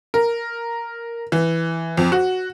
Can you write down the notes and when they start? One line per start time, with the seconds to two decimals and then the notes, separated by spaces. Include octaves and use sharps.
0.14 A#4
1.32 E3
1.97 F2
2.12 F#4